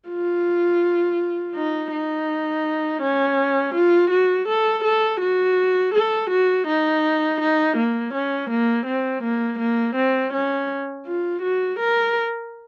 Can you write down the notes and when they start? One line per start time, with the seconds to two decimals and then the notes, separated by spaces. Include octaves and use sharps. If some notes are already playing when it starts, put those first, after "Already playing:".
0.09 F4
1.55 D#4
1.92 D#4
3.02 C#4
3.74 F4
4.11 F#4
4.48 A4
4.84 A4
5.20 F#4
5.94 A4
6.30 F#4
6.67 D#4
7.41 D#4
7.77 A#3
8.14 C#4
8.50 A#3
8.86 C4
9.23 A#3
9.59 A#3
9.96 C4
10.33 C#4
11.06 F4
11.42 F#4
11.79 A#4